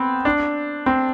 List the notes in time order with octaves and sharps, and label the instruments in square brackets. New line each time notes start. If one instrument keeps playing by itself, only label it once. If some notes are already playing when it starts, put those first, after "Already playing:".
Already playing: [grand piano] B3 C4
D4
C4